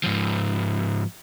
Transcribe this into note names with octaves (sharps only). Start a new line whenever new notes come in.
G#2 F3